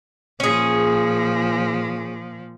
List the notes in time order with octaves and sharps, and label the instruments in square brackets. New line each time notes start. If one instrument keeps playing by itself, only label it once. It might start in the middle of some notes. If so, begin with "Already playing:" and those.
[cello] A#2 F3 [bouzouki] C#4 G#4